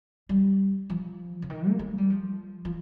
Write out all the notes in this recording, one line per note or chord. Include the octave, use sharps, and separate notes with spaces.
G3
F3
C#3
D#3
A#3
G#3
G3
F3
F3